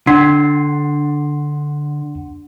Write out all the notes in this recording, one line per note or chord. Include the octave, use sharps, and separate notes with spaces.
D3 D4 F#5 C6 C7